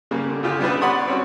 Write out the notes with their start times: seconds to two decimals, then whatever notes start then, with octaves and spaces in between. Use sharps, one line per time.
0.11 C#3 G3 A#3
0.29 D3
0.43 B1 C#3 F4 G4
0.60 G3 B3 D4 B4
0.81 C#5 D5 F#5 B5 C6 D#6
1.07 C4 C#4 F#4